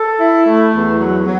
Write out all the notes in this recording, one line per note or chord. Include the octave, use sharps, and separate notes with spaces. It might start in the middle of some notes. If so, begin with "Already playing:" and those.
Already playing: A4
E4
A3
E2
F#3
F#3